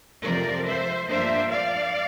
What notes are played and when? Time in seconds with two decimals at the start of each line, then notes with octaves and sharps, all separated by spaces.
0.24 F2 C3 F3 A#4 D5
0.67 C5 E5
1.09 G2 F3 A#3 D4 C5 E5
1.51 D5 F5